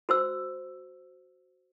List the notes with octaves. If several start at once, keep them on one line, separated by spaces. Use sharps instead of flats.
F#4 C5 E6